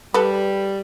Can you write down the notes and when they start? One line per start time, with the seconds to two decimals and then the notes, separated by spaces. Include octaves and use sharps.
0.14 G3 A4 B4